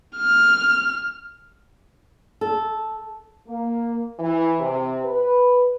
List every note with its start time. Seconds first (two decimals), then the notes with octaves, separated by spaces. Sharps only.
0.17 F6
2.41 A4
3.47 A#3
4.19 E3
4.60 C3
5.04 B4